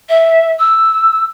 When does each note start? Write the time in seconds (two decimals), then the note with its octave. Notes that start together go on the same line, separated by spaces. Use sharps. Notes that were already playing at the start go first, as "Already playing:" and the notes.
0.09 E5
0.59 E6